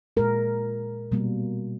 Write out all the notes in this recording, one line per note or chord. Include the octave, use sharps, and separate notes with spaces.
A#2 G#3 A#4
B2 G3 A#3